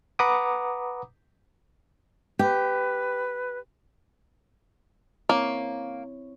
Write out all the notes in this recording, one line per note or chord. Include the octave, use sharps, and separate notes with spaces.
B4 F#5 A#5 B5 D6 D#6
G4 B4
A#3 C4 E4 C#5